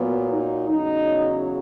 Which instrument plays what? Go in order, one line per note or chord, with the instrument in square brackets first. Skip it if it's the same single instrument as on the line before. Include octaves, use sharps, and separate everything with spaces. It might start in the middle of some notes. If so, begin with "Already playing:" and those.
Already playing: [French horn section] A#2 F#3 B3
D#4
E2 C#3 F#3 D#4